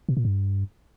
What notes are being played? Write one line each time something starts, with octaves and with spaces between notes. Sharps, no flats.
B2
A#2
G2